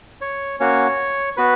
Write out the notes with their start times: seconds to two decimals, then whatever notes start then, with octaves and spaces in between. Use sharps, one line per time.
0.21 C#5
0.60 A#3 C#4 F#4 C#5
1.37 B3 F#4 B4